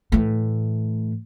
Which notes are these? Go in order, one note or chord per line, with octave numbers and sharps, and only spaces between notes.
A2 E3